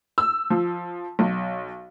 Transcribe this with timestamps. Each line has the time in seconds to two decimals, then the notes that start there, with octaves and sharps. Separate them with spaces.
0.18 E6
0.50 F3
1.19 B1